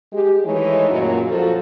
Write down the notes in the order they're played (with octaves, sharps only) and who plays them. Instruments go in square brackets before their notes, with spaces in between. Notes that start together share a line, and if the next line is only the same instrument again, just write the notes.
[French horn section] G#3 G4
D#3 E3 G#3 A3 D#4 C#5
F#2 A#2 F#3
F3 F#4 A4